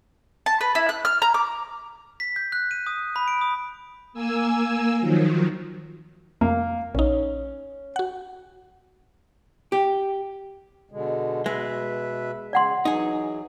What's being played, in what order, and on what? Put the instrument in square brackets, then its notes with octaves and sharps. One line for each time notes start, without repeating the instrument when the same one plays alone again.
[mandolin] A5
B4
E4
F#6
F6
A#5
D6
[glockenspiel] B6
G6
F#6
D#7
D#6
B5
D7
D#6
[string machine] A#3 G#5 E6
D#3 F3 F#3
[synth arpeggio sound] F2 [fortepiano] A#3
[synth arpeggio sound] A#1 D#4 [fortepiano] C#4
[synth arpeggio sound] F#4 F#5
[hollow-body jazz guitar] G4
[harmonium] B2 D3 G#3
[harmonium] B2 B4 E5 [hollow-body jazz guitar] G#3
[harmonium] C#3 [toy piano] D5 F#5 C6
[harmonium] E3 F#3 [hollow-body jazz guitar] D#4 G#4